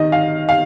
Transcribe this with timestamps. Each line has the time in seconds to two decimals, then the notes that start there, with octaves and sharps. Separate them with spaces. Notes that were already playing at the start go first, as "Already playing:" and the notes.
Already playing: D#3 D#5
0.12 F5
0.49 F5